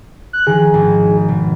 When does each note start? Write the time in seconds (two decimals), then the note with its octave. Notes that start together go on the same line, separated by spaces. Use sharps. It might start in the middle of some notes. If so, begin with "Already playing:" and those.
0.33 F#6
0.47 D#3 F3 G#4
0.74 G#1
1.28 B2